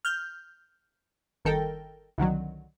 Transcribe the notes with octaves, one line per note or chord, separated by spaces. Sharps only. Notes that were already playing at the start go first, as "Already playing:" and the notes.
F6 G6
G1 D#3 A4 A#4 G5
C2 D3 D#3 F#3